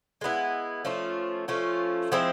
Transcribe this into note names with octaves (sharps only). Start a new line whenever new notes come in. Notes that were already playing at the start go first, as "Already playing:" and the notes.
G#3 B3 E4
F3 A3 C#4 F4
F3 A3 C#4 F4
F3 G#3 C4 E4